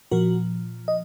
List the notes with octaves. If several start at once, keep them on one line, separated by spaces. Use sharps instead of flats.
A#2 F3 F#4 A#4
D#5